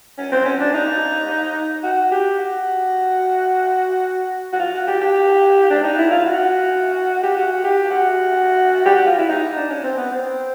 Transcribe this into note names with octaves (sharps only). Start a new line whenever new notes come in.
C#4
C4
C#4
D4
D#4
F#4
G4
F#4
F#4
F4
F#4
G4
G4
D4
D#4
E4
F4
F#4
G4
F#4
G4
F#4
G4
F#4
F4
E4
D#4
D4
C#4
C4
B3
C4